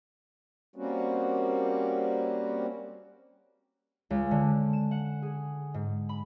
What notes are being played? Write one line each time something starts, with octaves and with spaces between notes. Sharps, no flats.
G3 A#3 C4 C#4 F#4
C#2
D3
E7
F#5
G#4
G#2
B5